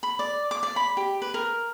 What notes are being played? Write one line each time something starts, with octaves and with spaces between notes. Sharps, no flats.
B5
D5
D6
D5
B5
G4
B4
A#4